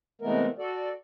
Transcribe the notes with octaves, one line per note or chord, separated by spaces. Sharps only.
C3 E3 G#3 A3 B3 A#4
F#4 A4 D5